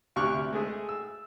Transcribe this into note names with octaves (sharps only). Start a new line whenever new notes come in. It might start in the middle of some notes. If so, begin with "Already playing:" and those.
D2 C3 C#6 D6 F6 F#6
G#3 A3 G#4
E6